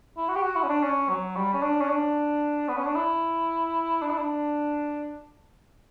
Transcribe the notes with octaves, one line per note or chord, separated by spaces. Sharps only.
E4
F#4
G4
F#4
E4
C#4
D4
C#4
F#3
G3
C#4
D4
C#4
D4
B3
C#4
D4
E4
D4
E4
D4